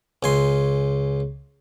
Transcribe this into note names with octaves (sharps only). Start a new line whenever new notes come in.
C#2 G#5 C6